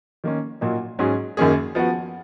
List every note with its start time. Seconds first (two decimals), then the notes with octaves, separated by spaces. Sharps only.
0.24 D#3 A#3 C#4
0.61 A#2 F#3 A#3 D#4 F#4
0.99 G#2 F#3 C#4 G#4
1.37 F#2 D#3 A#3 C#4 G#4
1.75 F3 B3 F#4